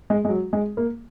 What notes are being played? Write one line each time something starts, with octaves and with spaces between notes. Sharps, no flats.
G#3
G#3
F#3
G#3
A#3